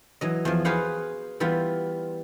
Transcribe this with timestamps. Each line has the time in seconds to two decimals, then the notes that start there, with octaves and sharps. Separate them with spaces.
0.21 E3 F#3 D#5
0.45 E2 F3
0.65 F#4 G#4 B4 C5 F5 F#5
1.40 E3 G3 B3 F4